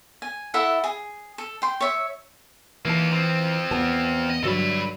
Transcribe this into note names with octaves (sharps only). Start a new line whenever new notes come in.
G#5
E4 A4 E5 F#5
G#4
A4
G5 C6
C#5 E5
E3 A#3 D#4 A5
F3 C4
E2 B3 A5
D#5
G2 D3 F#3 A4 B5